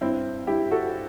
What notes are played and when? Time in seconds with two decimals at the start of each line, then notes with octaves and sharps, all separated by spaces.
0.01 G2 C4 E4
0.47 G2 E4 G4
0.71 F#4 A4